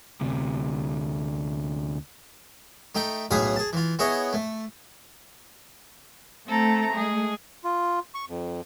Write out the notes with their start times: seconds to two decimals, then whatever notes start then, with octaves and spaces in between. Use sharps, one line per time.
0.21 D2 C3
2.95 A3 D#4 G5
3.31 B1 A2 G#4 B4 F5 D#6
3.56 G#4 A5
3.73 E3 F4
3.99 B3 E4 G#4 C#5 D#5
4.33 A3
6.48 A3 C4 A4 A#5
6.93 G#3 G#4
7.64 F4
8.14 C#6
8.28 F2